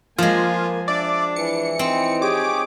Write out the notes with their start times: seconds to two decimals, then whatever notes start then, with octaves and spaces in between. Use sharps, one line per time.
0.18 F3 G#3 A#3 F4 G#5
0.88 D4 D5 E5
1.36 E3 C#7
1.79 C4 D#4
2.22 G4 G#4 C#5 D6